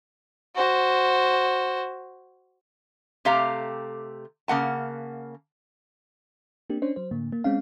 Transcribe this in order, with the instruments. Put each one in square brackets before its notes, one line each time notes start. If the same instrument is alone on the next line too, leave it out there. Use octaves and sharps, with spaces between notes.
[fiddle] F#4 C5
[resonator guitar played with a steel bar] C3 A3 G4 F5 A#5
C#3 A#3 F#5 A5
[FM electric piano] A#3 C4 D4 G4
C#4 D4 C5 C#5
F#3 C5
A2 D3 A#3
A#3
G#3 C4 C#4 F5